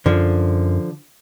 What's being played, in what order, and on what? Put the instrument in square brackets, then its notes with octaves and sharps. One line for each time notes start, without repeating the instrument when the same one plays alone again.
[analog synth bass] F#2 [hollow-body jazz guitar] D3 F3